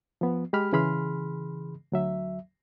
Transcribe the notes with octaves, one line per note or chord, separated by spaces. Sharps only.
F3 B3
G#3 G4 B5 F6
C#3 E3 G#4 B5 C6 F6
D2 F#3 E5